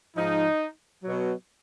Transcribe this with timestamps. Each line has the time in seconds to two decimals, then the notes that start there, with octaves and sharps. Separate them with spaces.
0.17 G#2 F3 D#4
1.03 B2 F#3